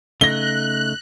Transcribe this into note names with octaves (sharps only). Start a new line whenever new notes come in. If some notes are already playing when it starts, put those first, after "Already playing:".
C#3 A3 D#4 F#6 A#6 G7